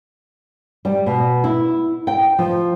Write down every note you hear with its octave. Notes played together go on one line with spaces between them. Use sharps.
G3
B2
E4
G5
F3